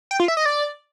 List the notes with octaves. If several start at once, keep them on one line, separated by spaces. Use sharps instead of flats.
G5
F4
E5
D#5
D5